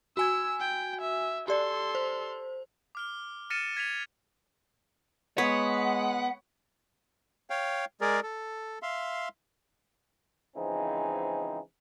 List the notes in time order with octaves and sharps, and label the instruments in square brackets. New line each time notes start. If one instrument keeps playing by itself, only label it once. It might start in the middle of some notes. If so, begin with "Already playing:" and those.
[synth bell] F#4 G#5 G#6 [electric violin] E6
[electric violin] G5
E5
[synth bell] G4 D5 [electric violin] A4 C6
[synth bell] C5
[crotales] D6 F6 G7
F6 A6 A#6 C#7 D#7 E7
G#6 B6 D#7 F7
[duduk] G#3 [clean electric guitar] B3 [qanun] C#5 [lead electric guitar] F#5
[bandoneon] C#5 F5 G5
G#3 G#4 A#4 D5
A4
E5 F5 C6
[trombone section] C#3 E3 F3 G#3 C4 D#4